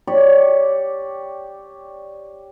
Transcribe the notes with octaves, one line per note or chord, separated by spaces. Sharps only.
G4 C#5 D5